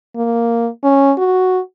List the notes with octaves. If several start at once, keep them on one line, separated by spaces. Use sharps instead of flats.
A#3
C#4
F#4